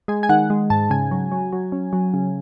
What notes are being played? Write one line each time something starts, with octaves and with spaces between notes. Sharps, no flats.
G#3 G#5
G#5
D#3 F#5
G#3
G#2 A5
C#3 G#5
F#3
F#3
F#3
C#4
F#3
C#3